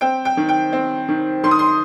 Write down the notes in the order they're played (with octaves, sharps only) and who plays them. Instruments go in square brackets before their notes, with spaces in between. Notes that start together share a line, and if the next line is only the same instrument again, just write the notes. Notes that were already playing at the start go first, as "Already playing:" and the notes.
[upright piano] C4 G5
G5
D#3
G5
C4
D#3
D#3 C6
D#6
C6